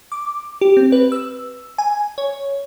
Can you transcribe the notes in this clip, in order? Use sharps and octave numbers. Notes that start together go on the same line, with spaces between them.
D6
G4
C4
B4
E6
G#5
C#5